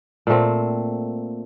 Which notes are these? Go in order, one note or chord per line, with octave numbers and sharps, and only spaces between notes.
A#2 A3 C4